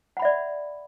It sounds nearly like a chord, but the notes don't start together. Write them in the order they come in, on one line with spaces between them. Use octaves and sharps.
F#5 B5 E5 D5